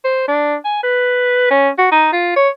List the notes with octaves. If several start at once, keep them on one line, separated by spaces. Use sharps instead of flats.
C5
D4
G#5
B4
C#4
F#4
D#4
F4
C#5